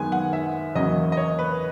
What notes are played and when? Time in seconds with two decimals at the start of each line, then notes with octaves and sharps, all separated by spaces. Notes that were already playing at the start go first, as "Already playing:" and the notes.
Already playing: F#2 D#3 G#3 B3 G#5
0.12 F#5
0.33 E5
0.75 E2 C#3 F#3 A#3 D#5
1.12 D#5
1.17 C#5
1.39 B4